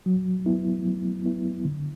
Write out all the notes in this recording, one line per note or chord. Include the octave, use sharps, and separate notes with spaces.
F#3
B3 E4
F#3
B3 E4
D3